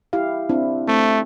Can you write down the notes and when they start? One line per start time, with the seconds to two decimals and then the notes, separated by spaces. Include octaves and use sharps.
0.13 E4 G4 F5
0.49 C4 D4 E4
0.88 A3 C4